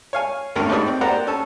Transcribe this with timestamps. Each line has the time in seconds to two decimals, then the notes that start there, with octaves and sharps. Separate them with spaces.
0.13 C#5 F5 G#5
0.56 G#1 D2 G2 C#4 A#4 A#5
0.69 A1 G#2 B3 C#5 B5 D#6
0.86 C4
1.01 A#3 G4 C5 D5 F#5 A#5
1.27 C#4 A4 A5